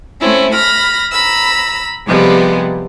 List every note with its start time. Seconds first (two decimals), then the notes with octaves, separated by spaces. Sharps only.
0.20 A3 C4 C#4 E4
0.54 B5 F6 A#6
1.11 A#5 B5 E6
2.06 C3 F3 G3 G#3 B3